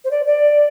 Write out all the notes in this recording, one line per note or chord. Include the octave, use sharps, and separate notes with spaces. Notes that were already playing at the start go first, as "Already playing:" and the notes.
C5
D5
D5